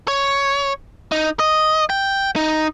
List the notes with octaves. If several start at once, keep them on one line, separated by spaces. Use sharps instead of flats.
C#5
D#4
D#5
G5
D#4